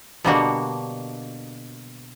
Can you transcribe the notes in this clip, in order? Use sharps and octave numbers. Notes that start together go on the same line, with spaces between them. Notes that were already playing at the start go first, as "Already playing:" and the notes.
B2 D3 G3 A#3 D4 F#4